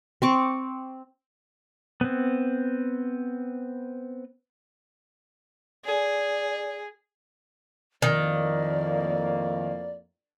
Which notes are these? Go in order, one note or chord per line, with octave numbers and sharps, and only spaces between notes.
C4 C#6 D6
B3 C4
G#4 D5
F2 A2 D#3 A#3 D5